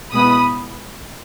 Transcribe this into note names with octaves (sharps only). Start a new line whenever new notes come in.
B2 G#3 B3 E4 B5 D#6